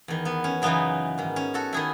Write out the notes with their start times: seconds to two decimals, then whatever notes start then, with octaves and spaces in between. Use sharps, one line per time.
0.08 E2 D#3
0.25 B3
0.44 C#4
0.62 F#2 C#3 E3 B3 D#4
1.18 G#2 D#3
1.36 C#4
1.54 F#4 A4
1.73 D#3 E4 G#4